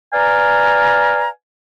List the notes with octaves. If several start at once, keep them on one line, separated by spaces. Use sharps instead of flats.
B4 D5 F5 G#5 A#5